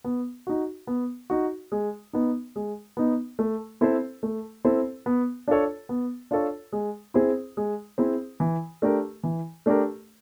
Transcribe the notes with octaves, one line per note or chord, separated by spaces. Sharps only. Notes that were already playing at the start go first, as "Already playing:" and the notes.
B3
D#4 F#4
B3
D#4 F#4
G#3
B3 D#4
G#3
B3 D#4
A3
C4 E4 A4 C5
A3
C4 E4 A4 C5
B3
D4 F4 A4 C#5
B3
D4 F4 A4 C#5
G#3
C4 E4 G#4 C5
G#3
C4 E4 G#4 C5
E3
A3 D4 G4 A#4
E3
A3 D4 G4 A#4